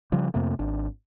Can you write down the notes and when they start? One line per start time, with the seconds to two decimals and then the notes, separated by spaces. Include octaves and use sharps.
0.12 C#3 F3 G3
0.34 F2 C3 A3 A#3
0.59 G#1 D4